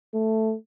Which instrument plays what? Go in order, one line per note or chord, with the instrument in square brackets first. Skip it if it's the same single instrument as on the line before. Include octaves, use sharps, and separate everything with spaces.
[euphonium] A3